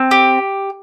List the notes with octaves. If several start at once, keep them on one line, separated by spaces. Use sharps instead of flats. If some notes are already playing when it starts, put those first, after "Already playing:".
Already playing: C4
G4